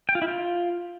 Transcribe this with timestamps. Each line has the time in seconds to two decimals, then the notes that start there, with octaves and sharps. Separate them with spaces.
0.09 G5
0.15 F4
0.22 E4
0.28 F4